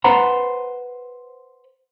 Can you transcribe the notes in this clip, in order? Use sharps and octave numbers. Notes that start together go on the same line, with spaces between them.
B4 C5 F#5 A#5 B5